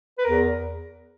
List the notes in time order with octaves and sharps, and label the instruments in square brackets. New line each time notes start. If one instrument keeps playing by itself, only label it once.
[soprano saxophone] B4
[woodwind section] E2 [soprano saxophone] A#4